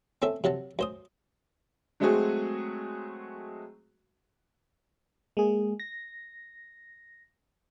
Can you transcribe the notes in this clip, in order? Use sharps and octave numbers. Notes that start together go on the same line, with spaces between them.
C4 C#4 A4 E5
C3 F#3 F#5 A5
F#2 C5 D#6
F#3 G#3 A3 C4 F#4 G#4
G#3 A#3 G#4
A#6